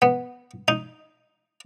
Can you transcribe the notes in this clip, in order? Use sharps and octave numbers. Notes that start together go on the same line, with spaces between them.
B3
D#4